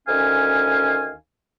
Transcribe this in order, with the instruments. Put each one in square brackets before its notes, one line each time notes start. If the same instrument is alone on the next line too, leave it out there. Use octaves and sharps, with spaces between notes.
[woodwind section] D2 D#3 C#4 F5 G#5